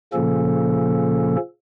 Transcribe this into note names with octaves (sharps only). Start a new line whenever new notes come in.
A#2 C#3 F3 A#3 C#4 A4